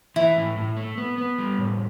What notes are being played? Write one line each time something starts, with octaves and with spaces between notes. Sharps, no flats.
E3 E4
A2
A2
A3
B3
B3
G3
A2